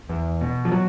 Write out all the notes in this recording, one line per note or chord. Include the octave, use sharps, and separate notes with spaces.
E2
B2
F3
F#3